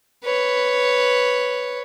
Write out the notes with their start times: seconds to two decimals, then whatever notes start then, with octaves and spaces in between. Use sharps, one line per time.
0.24 B4 C#5